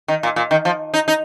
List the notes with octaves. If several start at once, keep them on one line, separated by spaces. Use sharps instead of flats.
D#3
A#2
A#2
D#3
F3
D#4
D#4